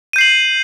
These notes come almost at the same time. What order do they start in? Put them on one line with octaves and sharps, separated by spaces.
D#7 G6 C7 F#7